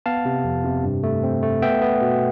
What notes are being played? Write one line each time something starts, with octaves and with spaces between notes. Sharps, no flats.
B3 F5 A5
C3
F2
C3
G2
A3
C4
A3
B3 E5 G5
B3
B2